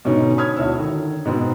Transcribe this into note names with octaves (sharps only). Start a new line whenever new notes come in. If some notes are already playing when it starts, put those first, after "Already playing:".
G#2 B2 D3 C#4 D#4
C#5 B5 D#6 F6 G#6
D2 B2 E4 C#5 E6
D3 D#3
G#2 B2 B3 C4